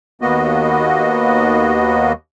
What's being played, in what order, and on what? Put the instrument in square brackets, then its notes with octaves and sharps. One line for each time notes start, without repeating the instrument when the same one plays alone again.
[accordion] D#2 A#3 B3 F#4 D#5